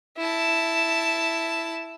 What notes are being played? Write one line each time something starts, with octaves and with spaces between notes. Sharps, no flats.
E4 A5